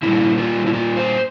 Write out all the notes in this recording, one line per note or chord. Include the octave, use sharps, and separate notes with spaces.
A#2 G3 A#3 E4
F4
E4
F4
C5